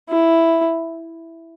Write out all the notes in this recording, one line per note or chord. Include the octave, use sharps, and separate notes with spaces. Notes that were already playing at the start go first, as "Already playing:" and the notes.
E4